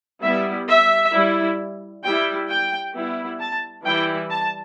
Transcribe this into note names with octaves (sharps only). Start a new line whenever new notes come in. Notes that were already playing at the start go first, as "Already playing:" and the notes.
G3 B3 E4 E5
E5
G3 E4
G3 E4 G5
G5
G3 B3 E4
A5
E3 G3 E4 G5
A5